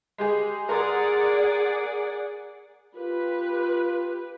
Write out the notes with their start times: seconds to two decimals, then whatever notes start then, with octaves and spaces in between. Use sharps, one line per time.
0.18 G#3 G4 G#4
0.69 G#4 A#4 D5 F#5 C6 D#6
2.96 F4 G4 B4